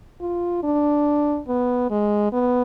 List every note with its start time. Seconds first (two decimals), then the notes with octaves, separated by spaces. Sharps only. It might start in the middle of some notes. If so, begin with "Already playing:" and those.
0.21 F4
0.64 D4
1.48 B3
1.90 G#3
2.32 B3